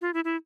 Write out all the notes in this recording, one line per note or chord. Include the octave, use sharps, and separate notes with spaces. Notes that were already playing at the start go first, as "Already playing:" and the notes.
F4
E4
E4